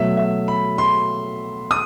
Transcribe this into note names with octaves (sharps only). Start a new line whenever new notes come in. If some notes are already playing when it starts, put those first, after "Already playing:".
Already playing: B2 F#3 A3 E5
E5
B5
C6
D#6